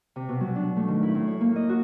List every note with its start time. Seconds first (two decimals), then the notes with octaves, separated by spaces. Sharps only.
0.16 C3
0.29 B2
0.40 F#3
0.55 D4
0.77 A3
0.88 D#3
1.03 E4
1.15 A2
1.27 C#5
1.41 A#3
1.56 D#5
1.69 F#4